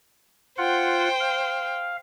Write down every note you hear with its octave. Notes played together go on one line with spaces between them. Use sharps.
F4 C5 F#5 G5
F5